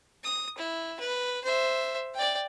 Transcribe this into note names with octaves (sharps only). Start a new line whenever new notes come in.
D#6
E4
B4
C5 E5
D5 G5